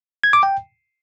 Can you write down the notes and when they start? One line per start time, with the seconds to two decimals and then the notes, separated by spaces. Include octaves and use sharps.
0.24 G#6
0.33 D6
0.43 G5